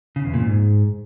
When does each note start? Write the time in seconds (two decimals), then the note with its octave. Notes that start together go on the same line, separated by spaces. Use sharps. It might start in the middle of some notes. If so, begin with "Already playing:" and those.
0.16 C#3
0.25 E2
0.34 A#2
0.42 G#2